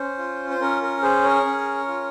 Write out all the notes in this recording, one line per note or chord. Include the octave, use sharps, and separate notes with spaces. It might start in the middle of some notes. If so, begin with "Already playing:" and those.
Already playing: C#4 C5
F4
C5
C#4 A#4
A#4
G#4 C5
A#4 C#5
C#4
F4